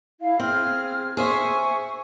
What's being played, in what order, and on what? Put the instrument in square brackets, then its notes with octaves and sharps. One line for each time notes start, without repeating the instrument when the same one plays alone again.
[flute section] E4 F5
[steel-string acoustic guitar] C4 [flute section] G#4 F6
[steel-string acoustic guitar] G#4 C5 E5 [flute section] C#6